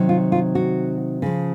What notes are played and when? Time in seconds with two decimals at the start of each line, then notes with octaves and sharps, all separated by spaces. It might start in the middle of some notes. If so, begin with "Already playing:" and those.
Already playing: C3 D#3 F#3
0.09 F4
0.32 F4
0.55 F#4
1.22 C#3 F3